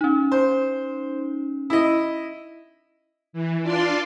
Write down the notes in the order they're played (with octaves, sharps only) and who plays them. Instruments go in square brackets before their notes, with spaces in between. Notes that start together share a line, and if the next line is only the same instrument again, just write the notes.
[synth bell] C#4 D#4
[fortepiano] C5
E4 D#5
[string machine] E3
D4 F4 D5 C6 D6